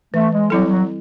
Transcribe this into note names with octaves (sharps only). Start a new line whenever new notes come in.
E3 A3
G#3
F#3 G3 C4 E4 A4
F#3